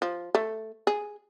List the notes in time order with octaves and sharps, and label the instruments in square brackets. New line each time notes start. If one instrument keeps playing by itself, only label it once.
[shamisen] F3
A3
G#4